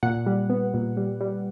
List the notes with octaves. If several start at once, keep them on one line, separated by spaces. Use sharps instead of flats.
A#2 F#5
G3
B3
A#2
G3
G3